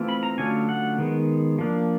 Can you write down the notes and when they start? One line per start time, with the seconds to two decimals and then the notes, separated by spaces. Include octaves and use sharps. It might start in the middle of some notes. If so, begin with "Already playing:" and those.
Already playing: E3 A3 C4 F4
0.09 B5
0.23 A#5
0.38 D3 F#3 A3 C#4 F4 G#5
0.69 F#5
0.98 D#3 G#3 B3
1.58 F3 A#3 D4